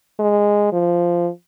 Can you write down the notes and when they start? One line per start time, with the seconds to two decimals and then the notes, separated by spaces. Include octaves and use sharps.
0.19 G#3
0.73 F3